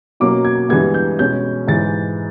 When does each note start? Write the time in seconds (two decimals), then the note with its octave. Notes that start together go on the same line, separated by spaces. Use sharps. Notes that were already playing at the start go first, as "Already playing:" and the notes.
0.20 B2 F#3 A#3 C#4 D6
0.45 G#6
0.69 G2 E3 G#3 B3 G#6
0.94 G6
1.19 B2 G#3 C#4 G6
1.68 G#2 E3 G#3 A6